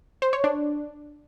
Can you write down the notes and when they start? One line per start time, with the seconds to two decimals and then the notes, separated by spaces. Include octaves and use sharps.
0.22 C5
0.33 C#5
0.44 D4